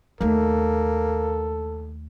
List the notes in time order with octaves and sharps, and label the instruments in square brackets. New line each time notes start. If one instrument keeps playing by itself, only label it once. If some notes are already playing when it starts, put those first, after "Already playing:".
[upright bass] D#2 A3 [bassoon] A#3 [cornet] A4